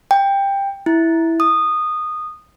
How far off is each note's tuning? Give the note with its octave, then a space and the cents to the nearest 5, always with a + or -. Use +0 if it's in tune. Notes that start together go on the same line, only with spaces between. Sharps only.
G5 +15
E4 -5
D#6 -15